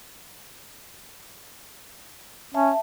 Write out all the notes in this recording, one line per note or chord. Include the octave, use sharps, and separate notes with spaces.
C#4 E5 A5